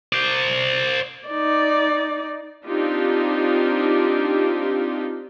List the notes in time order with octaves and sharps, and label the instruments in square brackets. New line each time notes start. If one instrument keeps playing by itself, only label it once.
[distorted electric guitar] C5 D5
[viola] D#4 D5
[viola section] C4 D4 D#4 F4 G4